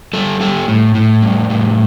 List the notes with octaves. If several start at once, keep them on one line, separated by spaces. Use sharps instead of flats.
G3 A4
G3 A4
A2
A2
G3
A2